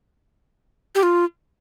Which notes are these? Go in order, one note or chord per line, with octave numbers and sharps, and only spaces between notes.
G4
F4